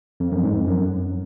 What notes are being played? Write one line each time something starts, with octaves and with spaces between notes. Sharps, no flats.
F2
F#2
G#2
F2
F#2